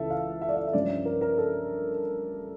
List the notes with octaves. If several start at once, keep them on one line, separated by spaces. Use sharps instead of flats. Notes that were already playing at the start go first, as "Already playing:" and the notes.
Already playing: C#2 C#3 E3 A4 E5
F5
E5
D5
E5
E5
G2 F3 C#4 D5
A#4
A#4
A4